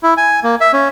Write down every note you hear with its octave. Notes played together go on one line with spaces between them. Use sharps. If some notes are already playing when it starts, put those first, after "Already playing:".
E4
G#5
A#3
E5
C#4